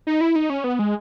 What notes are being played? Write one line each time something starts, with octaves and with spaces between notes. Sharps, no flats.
D#4
E4
D#4
C#4
B3
G#3